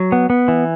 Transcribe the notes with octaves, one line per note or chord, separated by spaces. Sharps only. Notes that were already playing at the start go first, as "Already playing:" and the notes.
Already playing: F#3
B3
B3
E3